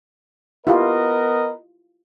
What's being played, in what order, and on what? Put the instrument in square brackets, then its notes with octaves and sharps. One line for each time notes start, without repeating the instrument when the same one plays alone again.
[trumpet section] B3 A#4 D#5 [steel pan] E4 F4 G4